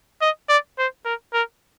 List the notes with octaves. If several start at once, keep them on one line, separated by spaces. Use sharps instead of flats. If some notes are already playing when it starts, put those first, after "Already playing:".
D#5
D5
C5
A#4
A#4